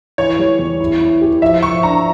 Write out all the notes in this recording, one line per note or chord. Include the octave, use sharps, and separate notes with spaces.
E3 C#5
G3
E2
E4
E4
G4
F3 E5
F3 C#6
D4 A#5